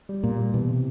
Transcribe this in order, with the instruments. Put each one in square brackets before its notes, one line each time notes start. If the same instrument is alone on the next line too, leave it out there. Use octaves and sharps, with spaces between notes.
[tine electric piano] G3
[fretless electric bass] A#2 [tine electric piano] A#3
[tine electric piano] G3
[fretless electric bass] B2 [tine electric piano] E3
[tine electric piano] C3